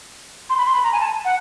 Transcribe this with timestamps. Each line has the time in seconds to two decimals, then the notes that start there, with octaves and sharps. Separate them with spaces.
0.50 C6
0.58 B5
0.66 C6
0.75 B5
0.84 A#5
0.92 G#5
1.00 A5
1.25 F#5